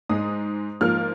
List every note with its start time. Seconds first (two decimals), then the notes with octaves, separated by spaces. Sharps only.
0.09 G#2 G#3 D#6
0.81 G#2 F3 A#3 F6